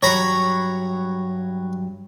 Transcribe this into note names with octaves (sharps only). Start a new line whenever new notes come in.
G2 F#3 C#5 A#5 B5